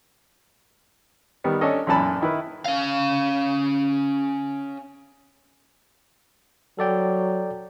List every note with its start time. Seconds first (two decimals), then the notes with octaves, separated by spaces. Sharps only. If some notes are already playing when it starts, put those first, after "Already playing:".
1.44 D#3 G3 B3
1.61 C#4 D4 A4 D#5
1.87 B1 F#2 A#2 E3 A5 B5
2.21 D#3 E4 B4
2.65 C#4 F5
6.79 F#3 A4 D5 G5